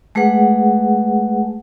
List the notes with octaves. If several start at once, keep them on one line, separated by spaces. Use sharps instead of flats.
G#3 A3 G#4 B4 F#5